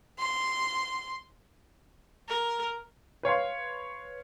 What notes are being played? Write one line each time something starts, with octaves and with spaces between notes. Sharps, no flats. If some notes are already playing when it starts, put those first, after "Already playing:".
C6
A#4
B4 C#5 F5 C6